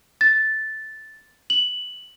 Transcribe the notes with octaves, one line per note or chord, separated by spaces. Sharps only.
A6
F#7